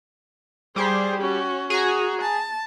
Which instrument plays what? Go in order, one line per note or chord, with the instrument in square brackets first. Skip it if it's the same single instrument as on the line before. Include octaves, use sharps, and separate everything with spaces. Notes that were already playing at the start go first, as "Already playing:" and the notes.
[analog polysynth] G3 G4 [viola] G#4 C5
[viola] C#4 F#4
[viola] F#4 [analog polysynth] G#4 G#5 A#5
[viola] A5